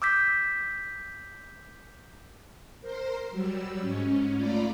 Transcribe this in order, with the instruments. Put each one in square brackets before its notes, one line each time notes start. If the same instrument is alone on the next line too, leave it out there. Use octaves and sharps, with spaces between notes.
[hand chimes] D6 E6 G6 B6
[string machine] A#4 C5 C6
F#3 G3 E6
G#2 C#4
A3 F4 D5 A#5 B5